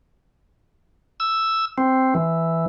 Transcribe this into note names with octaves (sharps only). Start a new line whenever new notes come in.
E6
C4
E3